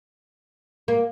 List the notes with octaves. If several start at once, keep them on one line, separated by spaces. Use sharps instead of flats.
A#3